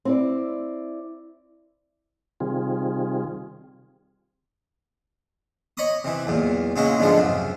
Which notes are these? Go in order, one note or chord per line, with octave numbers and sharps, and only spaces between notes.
C4 E4 D5
C3 D#3 G3 C4 F4 G#4
C#5 D#5 B5 D6 D#6
C3 E3
B1 E2 A#2
A#2 C#3 F#3 G#3 E4 F#4
G#2 B2 D3 F3 G#3 A3
C#2 F#2 C3